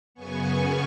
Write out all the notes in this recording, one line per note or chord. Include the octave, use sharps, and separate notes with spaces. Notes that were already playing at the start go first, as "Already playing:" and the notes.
F#2 C#3 B3 G#5 C#6